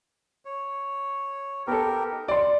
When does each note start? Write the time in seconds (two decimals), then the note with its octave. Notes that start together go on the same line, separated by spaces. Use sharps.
0.45 C#5
1.67 B3 G4 A4 A#4
2.11 D#4
2.28 D5 C6